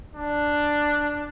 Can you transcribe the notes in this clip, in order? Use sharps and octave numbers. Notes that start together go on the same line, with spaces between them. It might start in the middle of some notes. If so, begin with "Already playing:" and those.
D4